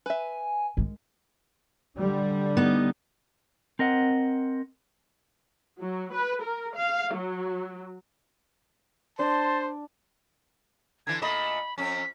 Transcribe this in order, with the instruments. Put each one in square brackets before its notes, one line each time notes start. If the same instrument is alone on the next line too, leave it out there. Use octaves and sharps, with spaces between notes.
[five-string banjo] B4 E5 [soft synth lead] G#5
[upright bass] D#3 G#3
[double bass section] D3 G3
[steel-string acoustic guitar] B3 D#4
[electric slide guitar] C4 A#4 D#5 F#5
[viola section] F#3
B4
A#4
F5
F#3
[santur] D4 [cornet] C5 [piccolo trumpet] A5 [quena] C6
[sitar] D3 E3 [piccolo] G#6
[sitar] A#2 A3 D#5 [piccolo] B5
[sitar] F2 C#4 [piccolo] B6